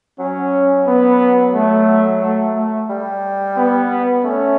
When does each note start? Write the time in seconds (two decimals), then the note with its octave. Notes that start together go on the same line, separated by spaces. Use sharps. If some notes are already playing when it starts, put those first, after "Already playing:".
0.19 F#3 C#4
0.87 B3
1.54 A3
2.22 A3
2.56 A3
2.89 G3
3.57 B3
4.24 A3 C#4